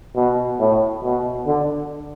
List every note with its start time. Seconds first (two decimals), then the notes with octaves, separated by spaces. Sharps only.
0.15 B2
0.59 A2
1.03 B2
1.47 D3